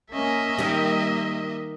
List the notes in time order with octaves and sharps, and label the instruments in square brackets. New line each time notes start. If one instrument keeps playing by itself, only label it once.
[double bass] A#3 C#4 [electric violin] D#5 E5
[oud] D#3 G3 [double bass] A#3